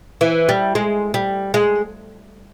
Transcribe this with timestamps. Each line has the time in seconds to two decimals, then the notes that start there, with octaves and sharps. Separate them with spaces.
0.21 E3
0.49 G3
0.75 G#3
1.14 G3
1.54 G#3